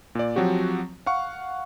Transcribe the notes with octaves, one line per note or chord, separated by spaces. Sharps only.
A#2 D5
F3 F#3 C4 F#4 G4
F5 F#5 C#6